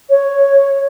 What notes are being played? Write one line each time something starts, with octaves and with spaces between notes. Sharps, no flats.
C#5